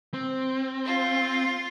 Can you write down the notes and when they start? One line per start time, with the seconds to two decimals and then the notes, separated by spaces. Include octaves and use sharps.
0.14 C4
0.85 F4